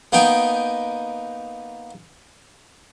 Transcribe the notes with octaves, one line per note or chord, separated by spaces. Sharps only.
A#3 B3 D#4 G5 G#5